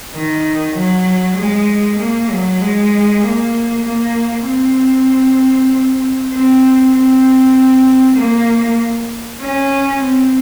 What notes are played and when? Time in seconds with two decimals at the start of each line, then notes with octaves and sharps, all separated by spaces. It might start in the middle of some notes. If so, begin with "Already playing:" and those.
0.15 D#3
0.75 F#3
1.37 G#3
1.99 A#3
2.31 F#3
2.61 G#3
3.23 A#3
3.85 A#3
4.46 C4
6.32 C4
6.94 C4
8.17 A#3
9.41 C#4
10.01 C4